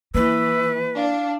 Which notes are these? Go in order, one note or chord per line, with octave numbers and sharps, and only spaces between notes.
E3 A#3 B4 E6
D4 F5